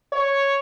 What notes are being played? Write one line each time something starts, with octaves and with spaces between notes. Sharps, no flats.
C#5